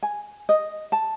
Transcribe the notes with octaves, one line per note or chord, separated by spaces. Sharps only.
G#5
D#5
A5